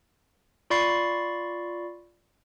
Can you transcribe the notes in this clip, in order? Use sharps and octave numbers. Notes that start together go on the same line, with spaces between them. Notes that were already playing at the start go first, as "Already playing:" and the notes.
F4 D5 B5 C#6 A6 C7